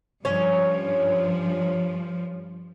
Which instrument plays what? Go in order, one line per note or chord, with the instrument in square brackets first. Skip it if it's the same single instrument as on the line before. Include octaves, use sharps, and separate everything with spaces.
[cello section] G2 F3 [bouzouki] C#4 C#5